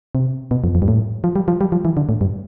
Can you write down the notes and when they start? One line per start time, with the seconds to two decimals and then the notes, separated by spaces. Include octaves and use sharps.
0.15 C3
0.51 B2
0.64 F2
0.75 F2
0.82 G2
0.88 A2
1.24 F3
1.36 G3
1.48 F3
1.61 G3
1.72 F3
1.85 E3
1.97 D3
2.09 A2
2.21 G2